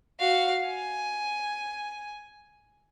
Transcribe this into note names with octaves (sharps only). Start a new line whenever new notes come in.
F#4 F5
G#5